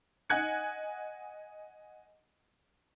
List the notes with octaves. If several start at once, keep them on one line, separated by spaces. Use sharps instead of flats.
D#5 F#5 G#5 F#6 G#6 C#7